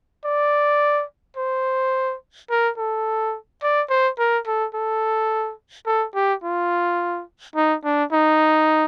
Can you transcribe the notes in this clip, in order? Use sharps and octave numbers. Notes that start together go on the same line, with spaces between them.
D5
C5
A#4
A4
D5
C5
A#4
A4
A4
A4
G4
F4
D#4
D4
D#4